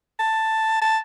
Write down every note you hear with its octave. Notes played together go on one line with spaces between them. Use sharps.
A5
A5